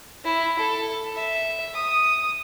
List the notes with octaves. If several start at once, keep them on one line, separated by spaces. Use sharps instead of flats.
E4
A4
E5
D#6